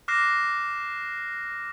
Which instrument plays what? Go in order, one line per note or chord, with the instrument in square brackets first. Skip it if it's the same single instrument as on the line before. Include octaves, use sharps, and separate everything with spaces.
[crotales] D6 F6 F#6 A#6 C7 E7